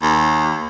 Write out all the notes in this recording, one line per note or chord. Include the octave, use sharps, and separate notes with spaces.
D#2